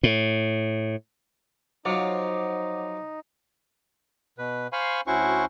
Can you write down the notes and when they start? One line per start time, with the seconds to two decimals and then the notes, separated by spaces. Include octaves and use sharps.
0.03 A2
1.85 F3 F#3 D#4 C#5 F#5 D6
4.38 B2 B4
4.73 C5 F5 G#5 B5 C#6
5.07 D2 C#4 E4 F#4 C5 C#6